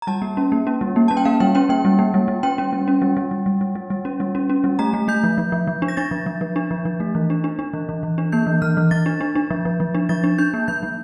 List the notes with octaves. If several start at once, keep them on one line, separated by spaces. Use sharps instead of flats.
A#5
G3 A5
A#3
C#4
A#3
C#4
G3
A#3
C#4 A5
G5
A#3 F5
G3 G5
C#4 G5
A#3 G5
G3
A#3
G3
G3
C#4 G5
C#4
G3
C#4
G3
G3
G3
G3
G3
G3
G3
C#4
G3
C#4
C#4
G3
A3 A#5
A3
A3 G6
F3
F3
F3
F3
D4
A#6
D4 A6
F3
F3
F3
D4
F3
F3
A3
E3
D4
D4
D4
E3
E3
E3
D4
A#3 G6
E3
E3 F6
E3
E3 A6
D4
D4
D4
F3
F3
F3
D4
F3 A6
D4
D4 G6
A#3
F3 G6
F3